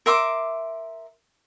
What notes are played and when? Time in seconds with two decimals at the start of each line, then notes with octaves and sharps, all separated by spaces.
0.06 A#4 E5 C6 D6